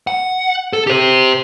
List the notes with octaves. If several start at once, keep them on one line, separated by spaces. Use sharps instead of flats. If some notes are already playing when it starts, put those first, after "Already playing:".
F#5
A4
G4 C5